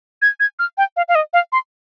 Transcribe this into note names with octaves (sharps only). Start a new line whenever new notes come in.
G#6
G#6
F6
G5
F5
F5
D#5
F5
C6